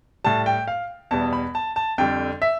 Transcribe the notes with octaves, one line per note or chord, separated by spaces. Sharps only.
A2 G3 A5
G5
F5
E2 B2 G3 A5
B5
A5
A5
F2 D3 G3 G5
E5